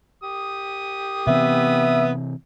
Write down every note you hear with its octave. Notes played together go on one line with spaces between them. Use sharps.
G4 D#6
C3 E3 B3 C4 E5